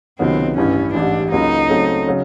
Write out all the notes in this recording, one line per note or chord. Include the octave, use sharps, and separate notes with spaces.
C#2 C3 D#3 F#3 B3 C4
A1 G2 E3 C#4
A1 G#2 E3 G3 D4
C#2 C#3 F#3 A#3 D#4
C#3 F#3 A3 C4
C#3 F#3